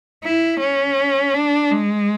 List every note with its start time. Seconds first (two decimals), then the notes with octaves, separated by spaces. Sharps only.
0.24 E4
0.60 C#4
1.34 D4
1.71 G#3